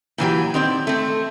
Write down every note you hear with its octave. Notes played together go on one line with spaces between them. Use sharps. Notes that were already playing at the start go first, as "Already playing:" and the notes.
A#2 E3 F#3 G4
D#3 C4 D5
A3 C4